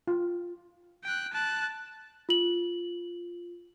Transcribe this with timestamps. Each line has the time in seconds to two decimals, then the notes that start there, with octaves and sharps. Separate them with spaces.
0.08 F4
1.04 G5 F#6
1.33 A5 F#6
2.29 F4 F#7